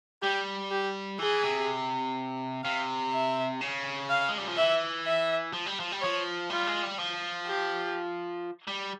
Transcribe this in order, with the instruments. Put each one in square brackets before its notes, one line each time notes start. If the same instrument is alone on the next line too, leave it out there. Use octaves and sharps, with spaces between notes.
[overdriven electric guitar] G3 [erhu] G4
[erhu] G4
[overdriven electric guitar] E3 [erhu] G#4
[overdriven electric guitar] C3
[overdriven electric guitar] C3 [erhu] F5
[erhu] E5
[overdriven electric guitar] C#3
[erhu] F5
[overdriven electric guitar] G#3
G3
F3
[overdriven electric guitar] E3 [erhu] E5
[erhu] E5
[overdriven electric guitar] F3
G3
F3
G3
[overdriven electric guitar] F3 [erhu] C#5
[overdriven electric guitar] G3 [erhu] F4
[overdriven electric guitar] G#3
G3
F3
[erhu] G4
[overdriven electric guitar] G3